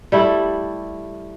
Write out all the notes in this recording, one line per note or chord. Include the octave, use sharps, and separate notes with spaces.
G3 A3 E4